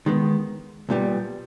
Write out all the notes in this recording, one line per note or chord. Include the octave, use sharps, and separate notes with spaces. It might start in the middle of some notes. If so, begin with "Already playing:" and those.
D#3 G#3 B3
B1 A#2 G3 B3